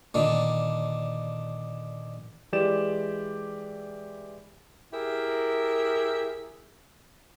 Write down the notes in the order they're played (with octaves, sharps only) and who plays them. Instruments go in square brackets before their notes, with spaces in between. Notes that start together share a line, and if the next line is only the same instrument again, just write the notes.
[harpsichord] A#2 D3 D#3
[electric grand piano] E3 G#3 G4 D5 E7
[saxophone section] E4 G4 G#4 A#4 E5